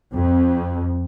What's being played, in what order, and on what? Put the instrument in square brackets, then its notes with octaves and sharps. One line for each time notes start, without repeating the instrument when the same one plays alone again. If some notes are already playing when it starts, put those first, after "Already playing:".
[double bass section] F2